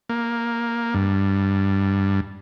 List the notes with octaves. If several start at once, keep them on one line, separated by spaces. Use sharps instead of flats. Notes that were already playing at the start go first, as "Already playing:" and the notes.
A#3
G2